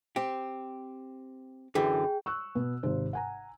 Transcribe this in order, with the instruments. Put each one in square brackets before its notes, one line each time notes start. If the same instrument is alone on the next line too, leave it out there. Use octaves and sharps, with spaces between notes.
[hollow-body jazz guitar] C4 G4
[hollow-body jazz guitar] F#2 D3 E3 [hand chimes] G#4 G5
[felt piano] C#6 E6 F#6
B2 B3
G#1 C3 C5
F#5 G#5 A#5